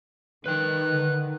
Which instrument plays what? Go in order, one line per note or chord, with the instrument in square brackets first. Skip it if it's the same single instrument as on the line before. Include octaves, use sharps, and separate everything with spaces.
[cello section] D#3 [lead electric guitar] B4 G5 [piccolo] F#6
[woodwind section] D3